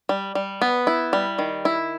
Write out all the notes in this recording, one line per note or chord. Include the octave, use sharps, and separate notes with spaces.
G3
G3
B3
E4
G3
D#3
E4